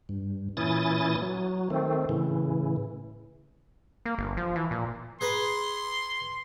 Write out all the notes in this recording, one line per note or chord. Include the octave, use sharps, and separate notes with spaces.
G2
A#2 E3 C#4 E4 D#6 A6
F#3
D#3 A3 C4
A2 C#3 E3
A#3
G1
F3
E3
A#2
G#4 B4 A#5 C6